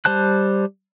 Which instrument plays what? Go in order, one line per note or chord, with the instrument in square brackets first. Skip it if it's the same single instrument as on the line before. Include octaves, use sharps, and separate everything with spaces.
[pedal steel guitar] G3 C5 A5 F#6